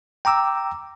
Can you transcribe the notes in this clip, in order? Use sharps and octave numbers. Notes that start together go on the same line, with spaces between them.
G5 A#5 D6 E6